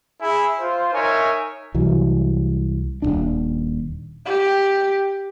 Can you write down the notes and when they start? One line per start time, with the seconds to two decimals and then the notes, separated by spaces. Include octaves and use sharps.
0.21 E4 G#4
0.59 F4 C5
0.93 D#4 A#4 C#5 E5 G#5
1.74 C2 E3 F#3
3.02 D#1 G#1 D4
4.26 G4